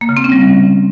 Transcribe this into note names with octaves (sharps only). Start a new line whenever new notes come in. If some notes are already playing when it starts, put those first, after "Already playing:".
A#3
C#3
C4
C#4
G3